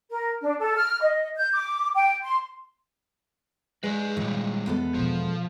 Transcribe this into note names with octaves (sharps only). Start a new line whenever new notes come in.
A#4
D4
A4
F6
D#5
G6
D6
G5
C6
G#3 G#4 B4 D5
A#2 D#3 E3 G3
E2 B3 A4
D#2 B2 F3